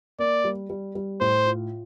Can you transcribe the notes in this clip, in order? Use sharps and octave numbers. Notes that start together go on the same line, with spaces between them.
A#3 D5
G3
G3
G3
A2 C5
F4